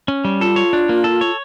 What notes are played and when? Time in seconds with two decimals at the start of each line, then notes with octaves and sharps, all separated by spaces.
0.08 C#4
0.25 G3
0.40 F4 A4
0.56 C#5
0.73 D4
0.89 A#3
1.04 A4
1.21 C#5